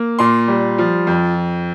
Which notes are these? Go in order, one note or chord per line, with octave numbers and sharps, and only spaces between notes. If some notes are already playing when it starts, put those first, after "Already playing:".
Already playing: A#3
A#2 C6
G3
F3
F2